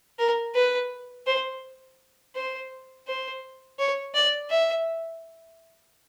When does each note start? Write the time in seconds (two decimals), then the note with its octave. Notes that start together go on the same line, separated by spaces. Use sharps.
0.19 A#4
0.55 B4
1.26 C5
2.35 C5
3.07 C5
3.79 C#5
4.15 D5
4.50 E5